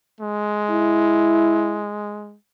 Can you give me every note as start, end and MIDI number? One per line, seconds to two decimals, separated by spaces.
0.20 2.36 56
0.71 1.88 64